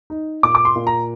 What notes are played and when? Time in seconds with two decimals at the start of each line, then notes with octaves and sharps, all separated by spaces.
0.10 D#4
0.43 A#2 D6
0.55 D6
0.65 C6
0.76 A#2
0.87 A#5